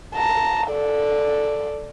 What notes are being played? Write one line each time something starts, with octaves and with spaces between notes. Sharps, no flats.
A5 A#5
A4 D5